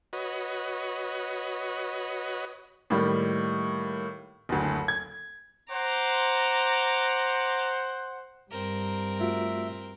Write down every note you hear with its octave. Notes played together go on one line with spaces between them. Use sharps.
F#4 B4 C#5 D#5
A2 D#3 G3 A#3
F#1 D2
G#6
C5 F#5 A#5 D6
G2 C4 A#4
A3 F4 F#4 E5